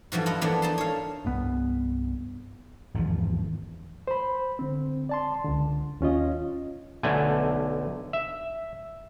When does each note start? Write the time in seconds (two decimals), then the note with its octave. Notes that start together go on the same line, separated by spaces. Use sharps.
0.12 G2 E3 F3 F#4
0.26 E4 F4 D#5 F#5
0.41 E3 F3 A#3 B3 D4
0.62 D#4 A5 C6
0.78 C#5 F5
1.25 C2 G2 B3
2.94 G#1 E2 G2 F3
4.07 C5 B5
4.59 D3 C4
5.09 D5 A5 C6
5.44 C#2 D3
6.01 D#2 C#4 F4 D#5
7.03 B1 D3 A3 G#5
8.13 E5